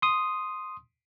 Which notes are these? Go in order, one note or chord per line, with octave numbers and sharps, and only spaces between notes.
C6 D#6